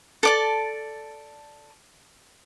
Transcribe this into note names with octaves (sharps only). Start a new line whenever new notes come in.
A4 D5 A5